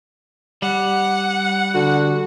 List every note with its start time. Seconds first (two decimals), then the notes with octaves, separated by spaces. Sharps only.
0.62 G3 F#5
1.75 D3 F#4